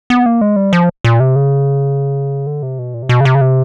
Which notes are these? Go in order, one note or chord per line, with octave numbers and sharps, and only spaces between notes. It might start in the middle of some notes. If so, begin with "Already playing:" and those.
B3
A#3
G#3
G3
F3
A#2
C3
C#3
D3
C3
B2
A#2
C3
B2
C#3
C3
C#3
C3